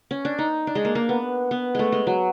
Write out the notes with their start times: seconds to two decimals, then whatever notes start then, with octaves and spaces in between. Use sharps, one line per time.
0.11 C#4
0.25 D4
0.39 D#4
0.67 D4
0.75 G#3
0.85 A#3
0.95 A#3
1.09 B3
1.51 B3
1.75 G#3 A3
1.92 G#3
2.07 F#3